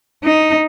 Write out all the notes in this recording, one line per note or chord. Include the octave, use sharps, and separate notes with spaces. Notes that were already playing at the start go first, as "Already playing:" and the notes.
D#4